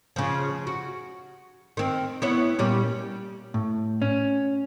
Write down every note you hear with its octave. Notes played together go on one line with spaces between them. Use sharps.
C#3 F3
F#4
D#3 C4
B3 E4 C#5
A#2 G3 C#4
A2
C#4